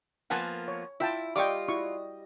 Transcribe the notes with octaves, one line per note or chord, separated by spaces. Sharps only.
F3 A#3 B3 F#5 G#5 A5
C#5
E4 F4 E5 G5 A5
G3 F4 D#5 G5 C#6 D6
E4 F#4 C#6